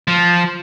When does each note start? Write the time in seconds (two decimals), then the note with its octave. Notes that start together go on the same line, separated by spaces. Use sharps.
0.08 F3